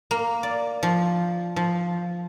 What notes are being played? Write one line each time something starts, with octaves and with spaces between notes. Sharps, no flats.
A#3
D5
F3
F3